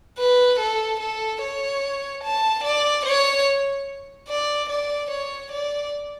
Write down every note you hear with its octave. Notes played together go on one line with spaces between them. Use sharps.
B4
A4
A4
C#5
A5
D5
C#5
D5
D5
C#5
D5